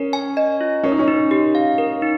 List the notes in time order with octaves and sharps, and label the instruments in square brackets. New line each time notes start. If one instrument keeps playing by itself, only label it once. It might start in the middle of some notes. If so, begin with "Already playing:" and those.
Already playing: [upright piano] C#4 [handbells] A#4
[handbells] G#5
D#5
F4
[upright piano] C#4 [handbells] A#4
[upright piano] D#4
C#4
[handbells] D#4
G4
F5
A#4
D#4